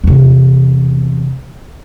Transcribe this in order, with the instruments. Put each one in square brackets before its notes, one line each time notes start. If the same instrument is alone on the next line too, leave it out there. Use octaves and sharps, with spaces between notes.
[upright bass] E2 C3